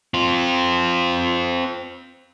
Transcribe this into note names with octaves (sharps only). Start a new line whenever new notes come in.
C4 F4